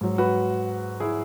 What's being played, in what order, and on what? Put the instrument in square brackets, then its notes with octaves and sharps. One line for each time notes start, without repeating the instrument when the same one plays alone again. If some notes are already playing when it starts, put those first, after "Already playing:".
[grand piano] G#2 F#3
F#4 B4
E4 G#4